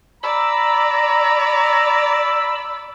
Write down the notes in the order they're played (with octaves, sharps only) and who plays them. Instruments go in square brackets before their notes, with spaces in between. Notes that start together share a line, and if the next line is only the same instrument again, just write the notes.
[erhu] D5 [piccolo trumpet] A#5 [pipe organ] B5 E6